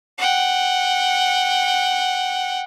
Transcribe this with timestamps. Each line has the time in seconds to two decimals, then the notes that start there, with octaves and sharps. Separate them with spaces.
0.18 F#5 G5